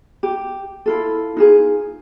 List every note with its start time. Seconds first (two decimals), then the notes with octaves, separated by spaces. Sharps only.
0.23 G4
0.86 E4 F4 A4
1.37 D#4 F4 G#4